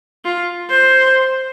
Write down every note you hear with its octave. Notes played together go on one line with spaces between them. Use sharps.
F4
C5